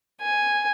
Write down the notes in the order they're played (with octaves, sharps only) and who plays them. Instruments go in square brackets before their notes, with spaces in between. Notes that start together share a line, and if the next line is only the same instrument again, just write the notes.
[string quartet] G#5